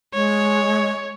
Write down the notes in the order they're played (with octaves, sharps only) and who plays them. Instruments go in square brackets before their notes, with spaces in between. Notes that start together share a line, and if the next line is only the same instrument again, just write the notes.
[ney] G#3 [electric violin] C#5